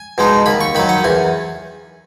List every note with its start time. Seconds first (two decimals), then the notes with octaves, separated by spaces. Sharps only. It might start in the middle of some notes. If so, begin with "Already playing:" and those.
Already playing: G#5
0.18 B2 G#3 D#4
0.46 D#2 B5
0.61 C#6
0.75 D#3 F#3 B5
0.89 F#5
1.04 E2 G#5